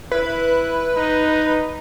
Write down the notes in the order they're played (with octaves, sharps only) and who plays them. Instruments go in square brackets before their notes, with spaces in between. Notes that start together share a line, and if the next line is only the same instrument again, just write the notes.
[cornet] E4 [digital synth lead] B4
[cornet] D#4